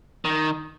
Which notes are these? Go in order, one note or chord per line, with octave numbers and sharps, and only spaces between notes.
D#3